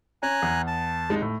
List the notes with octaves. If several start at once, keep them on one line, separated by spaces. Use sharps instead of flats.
C#4 G#5 A#5 F#6
E2
A5
G#1 G#3 D#4
A2